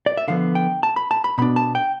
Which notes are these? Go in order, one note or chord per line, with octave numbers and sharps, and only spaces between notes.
D5
E5
D3 F3 B3 F5
G5
A5
B5
A5
B5
B2 B3 D4 B5
A5
G5